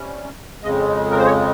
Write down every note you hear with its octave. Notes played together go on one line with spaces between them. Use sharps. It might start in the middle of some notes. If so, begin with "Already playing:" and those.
Already playing: C3 G3 C#4
F2 C#3 G#3 D#5
A#4
C5
C#5